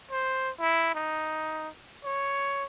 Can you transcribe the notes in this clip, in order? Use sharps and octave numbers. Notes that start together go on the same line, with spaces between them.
C5
E4
D#4
C#5